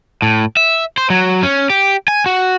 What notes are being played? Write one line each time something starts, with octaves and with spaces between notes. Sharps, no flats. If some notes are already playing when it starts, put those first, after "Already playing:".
A2
E5
C5
F#3
C#4
G4
G#5
F#4